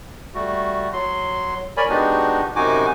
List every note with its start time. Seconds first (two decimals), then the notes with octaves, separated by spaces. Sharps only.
0.35 G3 A3 F#4
0.93 F#3 C6
1.77 A#4 C#5 D5 G#5 B5
1.89 G#3 B3 D4 D#4 F#4 G4
2.56 F#2 C3 D#4 F#4 G#5 D6